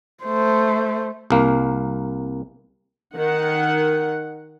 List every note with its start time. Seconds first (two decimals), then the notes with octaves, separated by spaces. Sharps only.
0.24 A3 C5
1.30 C2 A#3
3.16 D#3 F#5